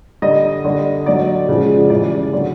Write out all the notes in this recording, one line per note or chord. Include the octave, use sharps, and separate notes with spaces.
D3 G3 D#5
D3 G3
D3 F#3 D5
C#3 F3 G#3
C#3 E3 G3 D5
D3 F#3